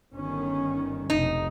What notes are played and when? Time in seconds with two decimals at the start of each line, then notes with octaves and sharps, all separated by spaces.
0.13 G1 D#3 C#4
1.10 F1 B1 D#4